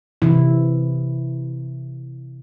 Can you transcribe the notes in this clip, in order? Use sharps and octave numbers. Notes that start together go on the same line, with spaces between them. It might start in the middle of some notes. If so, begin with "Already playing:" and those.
C3 E3 E4